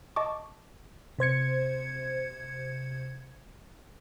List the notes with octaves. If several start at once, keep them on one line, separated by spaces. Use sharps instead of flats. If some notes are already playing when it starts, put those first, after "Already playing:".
D#5 A5 C#6 D6
C3 C5 G#6 C#7